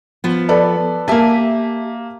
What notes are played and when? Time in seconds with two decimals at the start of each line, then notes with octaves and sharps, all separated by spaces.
0.24 F3 B3
0.49 A4 B4 D5
1.08 A#3 G4 E5 G#5 A5